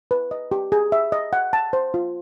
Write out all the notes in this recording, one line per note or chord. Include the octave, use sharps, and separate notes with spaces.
B4
D#5
G4
G#4
E5
D#5
F#5
A5
C5
F4